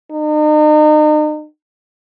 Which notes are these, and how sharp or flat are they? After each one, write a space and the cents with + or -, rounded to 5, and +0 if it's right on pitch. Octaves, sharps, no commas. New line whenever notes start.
D#4 -40